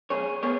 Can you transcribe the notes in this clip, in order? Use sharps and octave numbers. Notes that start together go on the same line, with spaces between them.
B1 G#4 C#5
B3 G#4 C#5